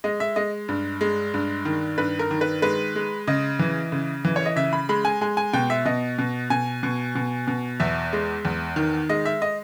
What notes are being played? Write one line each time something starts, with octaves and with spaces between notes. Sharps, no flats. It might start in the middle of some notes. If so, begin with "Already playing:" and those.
G#3 D#5
E5
G#3 D#5
G2
G#3
G2
D#3
G2 B4
A#4
D#3
B4
G#3 B4
G#3
C#3 D#5
E3
C#3
E3
C#5
D#5
C#3 E5
B5
G#3 B5
G#5
G#3 G#5
G#5
B2 G5
E5
B2 D#5
B2
B2 G#5
B2
B2
B2
E2 E5
G#3
E2
D#3
G#3 D#5
E5
D#5